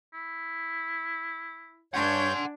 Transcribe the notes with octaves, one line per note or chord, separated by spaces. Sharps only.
E4
G2 D4 C#5 F#5 G#5 C6 G6